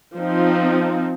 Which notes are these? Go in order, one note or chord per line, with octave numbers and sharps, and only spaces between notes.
F3 C4 D#4